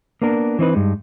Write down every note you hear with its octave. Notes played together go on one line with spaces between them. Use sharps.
A#3 B3 D4 A#4
E3 C4 D#4 B4
G2 G#3 D#4